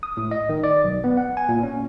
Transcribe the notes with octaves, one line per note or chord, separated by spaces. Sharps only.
D#6
A2
D#5
D#3
D5
B1
B3
F#5
G#5
A#2
C#4